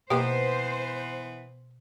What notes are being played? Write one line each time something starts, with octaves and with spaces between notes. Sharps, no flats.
B2 E3 A#3 B3 D#4 G4 C5